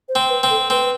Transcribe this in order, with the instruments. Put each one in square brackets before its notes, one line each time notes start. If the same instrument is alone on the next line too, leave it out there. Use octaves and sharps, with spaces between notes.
[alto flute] C5
[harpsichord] C4
[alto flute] B4
[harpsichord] C4
[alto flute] A4
[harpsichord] C4 [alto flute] B4